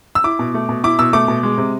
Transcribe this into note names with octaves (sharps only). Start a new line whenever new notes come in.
E6
E4 D6
B2
A3
B2
E4 D6
B2 E6
A3 D6
B2
G#3
C3